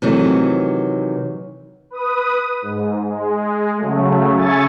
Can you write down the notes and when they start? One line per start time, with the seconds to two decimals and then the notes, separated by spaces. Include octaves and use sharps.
0.02 C3 D#3 E3 F#3 A3
1.90 B4 D#6
2.62 G#2
3.04 G#3
3.77 C#3 F#3 A3
4.34 C#3 E5 G#5 C#6 A6